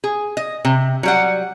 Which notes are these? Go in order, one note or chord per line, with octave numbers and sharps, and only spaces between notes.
G#4
D#5
C3
F#3 G3 F#5